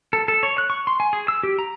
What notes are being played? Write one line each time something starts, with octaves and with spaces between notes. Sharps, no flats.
A4
A4
C#5
F#6
C#6
C6
G#5
G#4
E6
G4
A#5